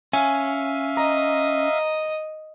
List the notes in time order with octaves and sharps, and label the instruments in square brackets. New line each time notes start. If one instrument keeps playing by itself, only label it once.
[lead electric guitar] C#4 [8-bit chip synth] E5 F5 [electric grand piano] G#5
[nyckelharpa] D#5 [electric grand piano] A#5